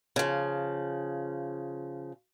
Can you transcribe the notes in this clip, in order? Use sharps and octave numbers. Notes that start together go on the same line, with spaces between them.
C#3 F3